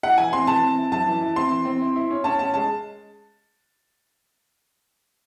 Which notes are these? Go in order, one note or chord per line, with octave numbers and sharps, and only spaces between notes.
E4 F#5
E3 G#5
C4 C6
E3 A5
C4
E4
F#2 A5
E3
E4
C4 C6
E3
C4
E4
E4
C#4
C#4 A5
C#4 A5
G#3 A5